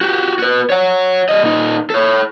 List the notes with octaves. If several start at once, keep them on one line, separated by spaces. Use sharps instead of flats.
F#4 G4
F#4 B4
C#5 F#5
G3 D#5
A#2 D#4
A4 C#5